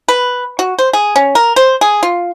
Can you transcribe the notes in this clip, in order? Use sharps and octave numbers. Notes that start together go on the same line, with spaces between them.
B4
F#4
C5
G#4
C#4
A#4
C5
G#4
F4